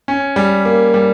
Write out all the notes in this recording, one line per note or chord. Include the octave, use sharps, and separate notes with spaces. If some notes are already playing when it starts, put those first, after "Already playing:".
C#4
G3
A#3
G3